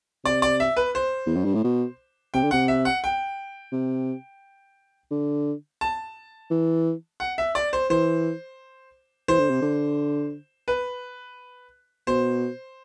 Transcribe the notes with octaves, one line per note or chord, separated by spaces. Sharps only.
C3 D5
D5
E5
B4
C5
E2
F#2
G2
A2
B2
C3 G5
D3
C3 F#5
E5
F#5
G5
C3
D3
A5
E3
F#5
E5
D5
C5
E3 C5
E3 C5
D3
C3
D3
B4
B2 C5